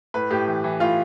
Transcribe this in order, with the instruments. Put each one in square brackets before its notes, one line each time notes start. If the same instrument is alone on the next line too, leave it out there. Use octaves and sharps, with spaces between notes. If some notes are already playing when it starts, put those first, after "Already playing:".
[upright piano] A2 B4
A2 G4
E3
E3
A2 F4